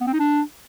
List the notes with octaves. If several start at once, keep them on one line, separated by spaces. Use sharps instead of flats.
B3
C4
D#4
D4